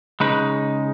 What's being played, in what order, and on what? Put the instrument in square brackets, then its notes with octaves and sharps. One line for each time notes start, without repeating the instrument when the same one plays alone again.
[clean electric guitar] C#3 G#3 D#4 B4